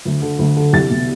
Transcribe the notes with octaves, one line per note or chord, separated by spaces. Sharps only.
D2
D3
D2
D3
C2 A6
B2